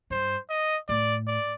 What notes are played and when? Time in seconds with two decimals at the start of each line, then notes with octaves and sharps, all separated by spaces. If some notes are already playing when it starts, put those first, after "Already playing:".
0.10 G2 C5
0.50 D#5
0.89 A2 D5
1.27 D5